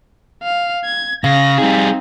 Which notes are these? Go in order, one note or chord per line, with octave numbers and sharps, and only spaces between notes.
F5
G#6
C#3 F5 A#6
G3 C4 D#4 G#4